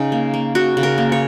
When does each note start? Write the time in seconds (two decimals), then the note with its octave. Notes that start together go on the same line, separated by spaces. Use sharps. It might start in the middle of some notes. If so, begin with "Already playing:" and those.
Already playing: C#3 C#4 D#4
0.12 A#3
0.34 A#3
0.55 C#3 F#4
0.77 C#3
0.83 A#4
0.98 A#3
1.12 C#5